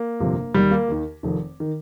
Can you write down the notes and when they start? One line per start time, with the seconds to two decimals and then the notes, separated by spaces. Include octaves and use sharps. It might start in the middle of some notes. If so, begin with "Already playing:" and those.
Already playing: A#3
0.20 G1 F2 C3 F3
0.55 D#2 D#3 G3
0.71 A#3
0.88 D#2 D#3
1.23 F1 F2 D#3
1.60 D#3